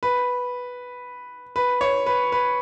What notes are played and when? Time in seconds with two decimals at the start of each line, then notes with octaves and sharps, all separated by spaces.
0.03 B4
1.56 B4
1.81 C#5
2.06 B4
2.32 B4